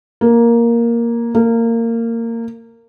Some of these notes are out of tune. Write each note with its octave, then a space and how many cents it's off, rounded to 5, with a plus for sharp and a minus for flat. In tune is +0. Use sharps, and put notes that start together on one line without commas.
A#3 +5
A#3 -20